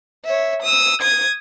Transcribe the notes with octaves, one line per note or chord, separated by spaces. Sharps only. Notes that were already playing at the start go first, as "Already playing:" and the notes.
C#5 E5
D#6 E6
D#6 G#6